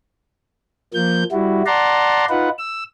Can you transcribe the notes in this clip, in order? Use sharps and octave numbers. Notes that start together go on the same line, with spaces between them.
F3 A#3 G6
G3 E4 F#4
D5 F#5 A5 A#5 C6
D#4 F4 B4 F#5
E6